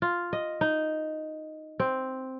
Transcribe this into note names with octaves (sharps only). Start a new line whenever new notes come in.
F4
D#5
D#4
C4